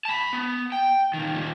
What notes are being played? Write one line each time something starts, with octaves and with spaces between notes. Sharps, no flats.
A5 B5
B3
G5
A#2 D#3
D#2 A#2